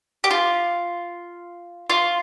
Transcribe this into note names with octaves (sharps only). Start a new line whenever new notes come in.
G4
F4
F4